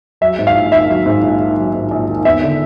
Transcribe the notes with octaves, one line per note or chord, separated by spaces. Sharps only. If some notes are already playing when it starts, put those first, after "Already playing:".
F#3 E5
G#2
F5
A#1
D#3 E5
F#3
G#2
A#1
D#3
F#3
G#2
A#1
D#3
B3 E5
D3